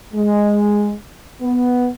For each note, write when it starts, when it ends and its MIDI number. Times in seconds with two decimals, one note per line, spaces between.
0.13 0.93 56
1.42 1.89 59